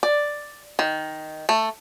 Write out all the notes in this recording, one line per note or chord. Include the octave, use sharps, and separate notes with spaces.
D5
D#3
A3